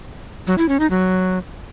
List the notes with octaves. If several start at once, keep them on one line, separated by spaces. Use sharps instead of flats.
F#3
E4
C#4
D#4
F#3